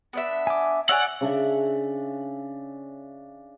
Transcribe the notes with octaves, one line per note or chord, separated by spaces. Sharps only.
B3 D4 E5
G#5 D6
C#5 D5 F#5 G#5 E6
C#3 D4 E5